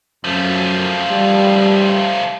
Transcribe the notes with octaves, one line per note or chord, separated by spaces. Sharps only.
F#2 F3 A3
G3